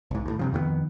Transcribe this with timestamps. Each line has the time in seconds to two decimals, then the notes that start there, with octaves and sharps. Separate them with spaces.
0.11 B1 G#2
0.26 D2 A2
0.39 G2 C3 F3
0.53 F2 D#3 F#3 B3